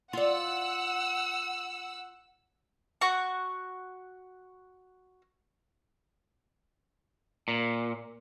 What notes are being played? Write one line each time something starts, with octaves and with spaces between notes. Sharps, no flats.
F4 D5 F#5 E6
F#4 C#6
A#2